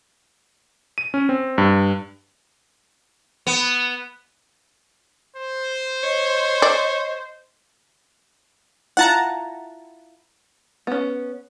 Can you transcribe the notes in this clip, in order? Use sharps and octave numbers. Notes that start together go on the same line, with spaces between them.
D#7
C#4
C4
G2
B3
C5
C#5 D#5
D5
E4 F4 F#5 A5 A#5
B3 C#4